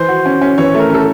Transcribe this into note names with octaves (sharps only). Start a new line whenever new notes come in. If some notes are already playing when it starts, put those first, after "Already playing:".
Already playing: E3 C5
F#4
C#4
C#4
E3 C#5
A3 A#4
C#4 A4